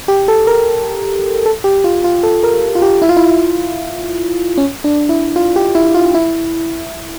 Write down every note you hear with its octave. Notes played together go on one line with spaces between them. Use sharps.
G4
A4
A#4
A4
G4
F4
F4
A4
A#4
F4
G4
E4
F4
E4
C#4
D4
E4
F4
G4
E4
F4
E4